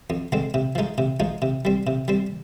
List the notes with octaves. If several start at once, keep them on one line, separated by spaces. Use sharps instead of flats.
F2
D3 G#3 C4
C3
F3 G#3 D#4
C3
F3 G#3 D#4
C3
G3 C4
C3
G3 C4